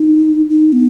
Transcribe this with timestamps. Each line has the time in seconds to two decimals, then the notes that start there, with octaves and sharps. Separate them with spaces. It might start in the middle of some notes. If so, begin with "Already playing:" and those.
Already playing: D#4
0.50 D#4
0.73 B3